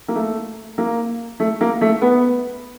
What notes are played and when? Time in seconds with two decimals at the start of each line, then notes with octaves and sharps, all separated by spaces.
0.08 A#3
0.15 A3
0.78 A#3
1.40 A3
1.61 A#3
1.81 A3
2.02 B3